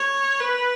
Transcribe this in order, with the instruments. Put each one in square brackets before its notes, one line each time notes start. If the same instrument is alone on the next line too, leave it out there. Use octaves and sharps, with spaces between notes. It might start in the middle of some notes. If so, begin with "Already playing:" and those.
Already playing: [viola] C#5
B4